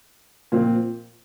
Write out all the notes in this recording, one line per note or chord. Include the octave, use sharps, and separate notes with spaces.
A#2 F3 C4